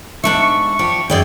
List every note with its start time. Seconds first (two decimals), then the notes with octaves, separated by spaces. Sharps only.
0.24 G#2 D4 E5 C#6
0.43 C#6
0.79 F3 D4 G4
1.10 F#2 G#4 D5 G5